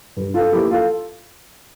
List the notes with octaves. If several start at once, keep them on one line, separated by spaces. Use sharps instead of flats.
G2
F4 A4
F3 A#3 E4 G4
F4 A4